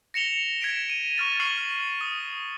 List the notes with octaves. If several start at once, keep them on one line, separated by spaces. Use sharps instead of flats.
A#6 C#7 E7 F7 G7
G#6 B6 D7 E7
D#7
C#6 F6 A6 D#7
C#6 F6 C7 F#7
D#6